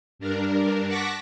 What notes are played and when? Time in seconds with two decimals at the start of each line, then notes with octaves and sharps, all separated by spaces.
0.19 G2 D4 A#4
0.87 F#5 A5 C#6 D6 A#6 B6